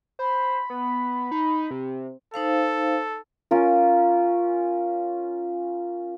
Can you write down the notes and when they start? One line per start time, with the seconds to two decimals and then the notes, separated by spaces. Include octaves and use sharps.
0.19 C5 B5
0.70 B3
1.31 D#4
1.71 C3
2.34 D#4 A4 C5 F5
3.51 C#4 F4 A#4